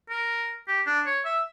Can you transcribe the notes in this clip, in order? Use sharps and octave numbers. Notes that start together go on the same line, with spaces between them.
A#4
G4
D4
C#5
E5